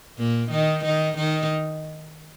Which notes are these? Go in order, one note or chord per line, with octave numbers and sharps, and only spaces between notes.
A#2 A#3
D#3 D#4
D#3 D#4
D#3 D#4